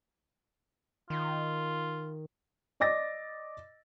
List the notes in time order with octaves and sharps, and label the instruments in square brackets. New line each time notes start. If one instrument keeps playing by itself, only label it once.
[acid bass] D#3 [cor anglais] F4
[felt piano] D5 D#5 D6 A6 A#6